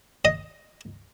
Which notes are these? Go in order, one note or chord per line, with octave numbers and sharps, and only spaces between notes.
D#5